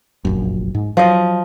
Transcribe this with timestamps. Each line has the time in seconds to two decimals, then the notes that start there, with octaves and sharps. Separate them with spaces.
0.25 F1 A#1 F#2
0.75 G#2
0.97 F3 F#3 D#5